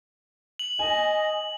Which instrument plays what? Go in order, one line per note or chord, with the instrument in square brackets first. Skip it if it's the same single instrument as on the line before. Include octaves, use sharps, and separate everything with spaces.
[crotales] F#7
[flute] D#5 [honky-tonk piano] G#5